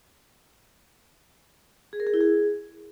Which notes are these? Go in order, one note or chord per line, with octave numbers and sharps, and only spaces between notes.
G#4
A#4
G#4
E4
G#4